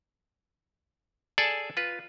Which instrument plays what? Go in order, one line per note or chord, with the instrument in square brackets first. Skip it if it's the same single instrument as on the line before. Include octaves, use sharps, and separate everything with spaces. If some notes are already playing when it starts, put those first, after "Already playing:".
[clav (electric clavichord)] G#4 A4 D5 G#5 A5
F4 B4